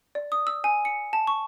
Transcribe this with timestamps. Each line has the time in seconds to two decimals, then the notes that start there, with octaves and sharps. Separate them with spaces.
0.15 D5
0.32 D#6
0.47 E6
0.64 G#5
0.85 C#7
1.13 A5
1.27 C#6